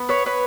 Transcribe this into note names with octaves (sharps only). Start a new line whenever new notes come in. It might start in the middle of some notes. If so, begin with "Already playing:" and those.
Already playing: B3
B4 C#5
B4 C#5